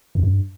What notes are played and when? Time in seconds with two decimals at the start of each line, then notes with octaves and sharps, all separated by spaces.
0.15 F2
0.23 F#2
0.31 G2